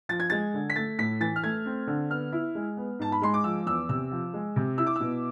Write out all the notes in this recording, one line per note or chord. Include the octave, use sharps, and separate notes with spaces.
F3 A6
G#6
G#3 A6
D3
B6
A3 A6
A2 B6
E3 A6
F6
A3 G#6
C4
D3
B3 F6
E4
G#3
B3
G#2 A5
B5
G#3 C6
D6
F3 E6
E2 E6
C3 E6
F3
G#3
C3
E4 E6
D6
B2 E6